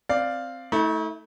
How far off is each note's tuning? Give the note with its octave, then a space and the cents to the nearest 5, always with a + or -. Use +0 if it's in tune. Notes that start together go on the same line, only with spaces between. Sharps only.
C4 +0 D5 +0 F5 +0
A3 +0 E4 -45